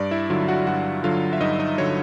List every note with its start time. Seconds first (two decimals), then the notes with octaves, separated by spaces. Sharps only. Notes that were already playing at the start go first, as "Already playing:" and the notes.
Already playing: G2 D5
0.11 E4 E5
0.30 D3 F#3 F4 F5
0.48 F#4 F#5
0.67 G2 F#4 F#5
1.04 D3 F#3 F4 F5
1.33 E5
1.40 G2 D#4 D#5
1.59 D#4 D#5
1.78 D3 F#3 C#5